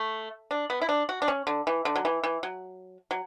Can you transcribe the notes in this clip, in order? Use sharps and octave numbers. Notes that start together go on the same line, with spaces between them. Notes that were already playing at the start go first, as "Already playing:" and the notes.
Already playing: A3
D4
B3
E4
D4
F#4
D4
C#4
D3
E3
D3
F#3
E3
E3
F#3
F#3